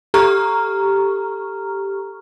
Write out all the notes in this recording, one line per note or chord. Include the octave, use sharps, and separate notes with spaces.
G4 A4 A#5 C#6 F6